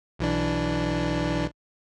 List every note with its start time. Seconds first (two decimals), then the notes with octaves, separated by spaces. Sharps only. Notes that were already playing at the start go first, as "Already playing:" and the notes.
0.19 B1 E3 D4